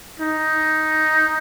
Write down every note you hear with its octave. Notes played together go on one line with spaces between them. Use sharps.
D#4